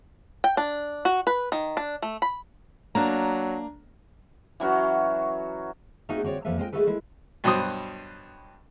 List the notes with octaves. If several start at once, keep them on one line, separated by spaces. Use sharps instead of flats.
G5
D4
F#4
B4
D#3
D4
A3
B5
F#3 A#3 D4 A#5
E3 F#3 C#4 F#4
A3 A#3 C4 D#4 F#4 G#4
D3 C4 F#4 C#5 D5
F2 F3 A#3 A4 B4 E5
G#3 C4 F4 C5 D#5 G5
G#3 A3 F#4 G#4 A4 B4
G#3 E4
G2 B2 F#3 C5 D#6